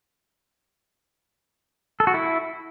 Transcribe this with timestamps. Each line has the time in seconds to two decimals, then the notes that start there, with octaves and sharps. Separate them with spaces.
2.00 A4
2.07 F#4
2.14 E4